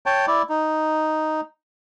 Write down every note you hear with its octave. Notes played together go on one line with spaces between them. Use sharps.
C#5 G5 A5
E4 D5
D#4